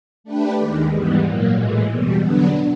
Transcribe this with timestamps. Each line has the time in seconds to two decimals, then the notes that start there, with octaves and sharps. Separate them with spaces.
0.24 A3 D4 G4 B4
0.57 D#2 D#3 G#3
0.89 G#2 E3 G3 B3
1.22 A#2 F#3 A#3
1.55 A2 E3 G#3
1.87 E2 B2 G3
2.20 D3 F#3 B3 D4